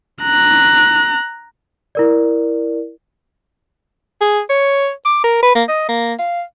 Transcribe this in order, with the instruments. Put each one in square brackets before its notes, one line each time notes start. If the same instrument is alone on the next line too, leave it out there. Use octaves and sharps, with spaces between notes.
[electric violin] A#5 F#6
[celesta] E4 A#4 D5
[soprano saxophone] G#4
C#5
D6
A#4
B4
A#3
D#5
A#3
F5